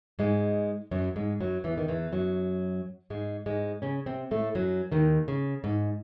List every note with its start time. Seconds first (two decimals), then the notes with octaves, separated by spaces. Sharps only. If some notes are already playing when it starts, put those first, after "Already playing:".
0.19 G#2 G#3
0.91 F#2 F#3
1.16 G#2 G#3
1.40 F#2 F#3
1.64 E2 E3
1.78 D#3
1.88 E2 E3
2.12 F#2 F#3
3.10 G#2 G#3
3.46 G#2 G#3
3.82 C#3 C#4
4.06 C3 C4
4.31 A2 A3
4.55 F#2 F#3
4.92 D#2 D#3
5.28 C#3
5.64 G#2